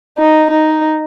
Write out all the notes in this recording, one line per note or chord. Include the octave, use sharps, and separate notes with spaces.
D#4
D#4